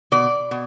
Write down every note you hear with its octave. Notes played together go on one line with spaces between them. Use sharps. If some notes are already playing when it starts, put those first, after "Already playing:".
B2 D5
B2